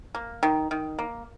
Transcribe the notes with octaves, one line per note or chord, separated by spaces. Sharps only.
A#3
D#3
D#3
A#3